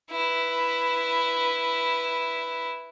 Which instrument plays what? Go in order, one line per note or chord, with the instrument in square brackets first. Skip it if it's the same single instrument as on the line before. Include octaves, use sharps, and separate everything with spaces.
[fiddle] E4 B4